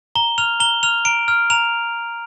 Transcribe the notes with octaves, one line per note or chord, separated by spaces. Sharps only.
A#5 G7
F6 F7
A#5 G7
F6 F7
A#5 D7
F6
A#5 F7